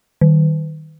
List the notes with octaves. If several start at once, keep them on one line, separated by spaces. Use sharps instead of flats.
D#3